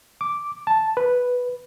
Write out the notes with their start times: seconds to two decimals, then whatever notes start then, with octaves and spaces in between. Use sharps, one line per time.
0.21 D6
0.67 A5
0.97 B4